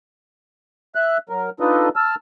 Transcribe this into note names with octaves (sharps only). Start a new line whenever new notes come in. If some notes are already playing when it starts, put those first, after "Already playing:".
E5 F#6
F#3 A#4
D4 D#4 F4 A4 B4 D#5
A5 E6 F6